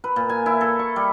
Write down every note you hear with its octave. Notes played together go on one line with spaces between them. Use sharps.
B4
A#2
G#5
E4
A4
C#6
G3